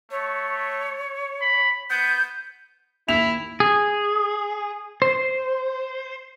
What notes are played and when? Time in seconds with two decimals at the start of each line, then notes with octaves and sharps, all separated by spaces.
0.11 A3 C#5
1.41 B5
1.90 B3 G6
3.08 D#2 E4 E5 F7
3.60 G#4
5.02 C5